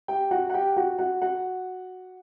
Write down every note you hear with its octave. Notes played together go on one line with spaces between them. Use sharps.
G4 G5
F#4 F#5
F#5
G4 G5
F#4 F#5
F#4 F#5
F#4 F#5